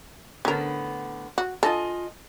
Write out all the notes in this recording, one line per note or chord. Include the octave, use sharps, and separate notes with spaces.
A2 D3 B3 C#4 A#4
F#4
F4 A4 D#5 G#5